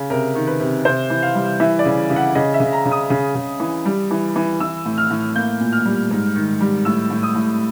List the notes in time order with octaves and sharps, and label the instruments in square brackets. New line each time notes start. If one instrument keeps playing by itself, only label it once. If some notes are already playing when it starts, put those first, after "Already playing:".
Already playing: [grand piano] C#3
C3 A#4
D#3
B4
C3
C3 C5
E3
F5
G3
E3 E5
D5
C#3
C#3
F#5
C#3 D#5
E5
C#3
A#5
C#3
D#6
C#3
C#3
E3
G3
E3
E3
E3 E6
A2
F6
A2
A#3 G6
A#2
F6
G3
G#2
D#3
G3
A2 E6
A2
D#6
A2